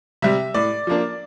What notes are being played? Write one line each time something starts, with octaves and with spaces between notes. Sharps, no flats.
C3 G3 E5
A2 D5
F3 A#3 D4